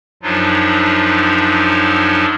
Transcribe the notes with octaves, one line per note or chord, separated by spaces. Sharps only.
F#2 F3 F#3 D4 D#4 F4